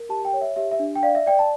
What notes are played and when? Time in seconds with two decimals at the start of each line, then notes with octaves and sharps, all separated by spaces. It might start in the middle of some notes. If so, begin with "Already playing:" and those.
Already playing: A#4
0.09 G4 A5
0.25 G5
0.33 C#5
0.41 E5
0.56 G4 E5
0.71 E5
0.79 D4
0.96 G5
1.03 D5 F5
1.15 E5
1.26 D5 G5
1.39 A5